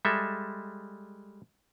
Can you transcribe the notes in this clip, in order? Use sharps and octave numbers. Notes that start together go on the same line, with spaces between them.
G3 G#3 A4 E5